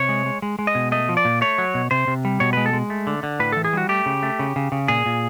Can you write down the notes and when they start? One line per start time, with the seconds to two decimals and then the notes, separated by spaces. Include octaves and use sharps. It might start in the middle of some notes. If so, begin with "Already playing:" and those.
Already playing: C3 C#5
0.09 G#3
0.26 G#3
0.42 G#3
0.59 G#3
0.67 D#5
0.75 B2
0.92 A3 D#5
1.09 F3
1.17 D5
1.25 A#2
1.41 A3 C#5
1.58 F#3
1.74 B2
1.91 C3 C5
2.07 C3
2.25 G3
2.40 B2 C#5
2.53 G#3 B4
2.66 A4
2.73 G#3
2.90 A3
3.07 D3
3.23 D3
3.40 A2 B4
3.52 E3 A4
3.65 G#4
3.73 G3 F#4
3.89 A3 G4
4.06 C#3
4.23 A3
4.39 C#3
4.56 C#3
4.72 C#3
4.88 A#2 G#4
5.06 A#2